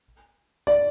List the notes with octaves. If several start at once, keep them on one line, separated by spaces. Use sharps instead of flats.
D5